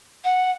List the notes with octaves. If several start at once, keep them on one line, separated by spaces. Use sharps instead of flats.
F#5